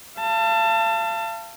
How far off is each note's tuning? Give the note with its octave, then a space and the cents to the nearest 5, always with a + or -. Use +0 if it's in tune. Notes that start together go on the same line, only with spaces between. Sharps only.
F5 -40 A5 +20